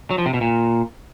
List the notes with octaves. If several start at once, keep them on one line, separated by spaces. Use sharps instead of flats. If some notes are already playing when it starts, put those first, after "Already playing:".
F#3
F3
C3
B2
A#2